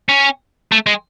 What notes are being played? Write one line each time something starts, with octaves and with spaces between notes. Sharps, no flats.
C#4
A3
G#3